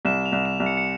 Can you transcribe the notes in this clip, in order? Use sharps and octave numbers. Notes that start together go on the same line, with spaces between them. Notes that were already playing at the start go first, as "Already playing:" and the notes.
C2 E7
F7
C2
E7
C2
C#7
C#7